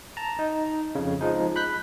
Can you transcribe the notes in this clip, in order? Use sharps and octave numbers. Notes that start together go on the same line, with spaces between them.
A5 A#5
D#4
F2 C#3
F3 G#3 D#4
B5 F#6 G6 B6